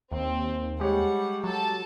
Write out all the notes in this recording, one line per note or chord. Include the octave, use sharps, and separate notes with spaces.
D#2 C4
G3 G#3 G4 C#5 F#5
F#3 A4 A5